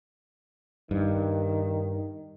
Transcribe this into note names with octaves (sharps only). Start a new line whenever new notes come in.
G2 D#3